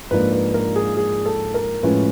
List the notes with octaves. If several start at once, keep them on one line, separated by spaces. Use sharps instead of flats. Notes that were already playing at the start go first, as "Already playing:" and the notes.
G#2 F3 A#3 D4 B4
B4
A#4
G#4
G#4
A4
A#4
A2 F3 G#3 C#4 B4